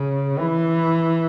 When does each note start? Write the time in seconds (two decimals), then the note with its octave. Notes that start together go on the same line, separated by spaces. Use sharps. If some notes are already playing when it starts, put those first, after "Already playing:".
Already playing: C#3
0.39 E3